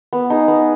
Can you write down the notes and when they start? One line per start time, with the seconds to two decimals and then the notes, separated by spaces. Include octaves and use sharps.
0.13 B3
0.30 D#4 G#4
0.48 B3